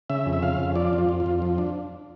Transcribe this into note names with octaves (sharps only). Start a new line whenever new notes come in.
C#3 E5
F2
E5
C#3 F5
F2
F3 D5
F2
F4
F2
F4
F2
F3
D4